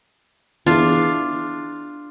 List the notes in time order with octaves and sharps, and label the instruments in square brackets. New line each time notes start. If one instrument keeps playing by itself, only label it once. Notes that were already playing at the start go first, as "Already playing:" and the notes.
[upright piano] E3 B3 E4 G#4 B4 [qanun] D4 F4